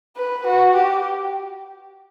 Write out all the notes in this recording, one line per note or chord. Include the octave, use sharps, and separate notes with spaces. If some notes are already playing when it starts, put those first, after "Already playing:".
B4
F#4
G4